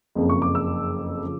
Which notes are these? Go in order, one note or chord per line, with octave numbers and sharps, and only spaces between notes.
F#1 F2 C#3 F3
C#6
D6
E6
C#3 F3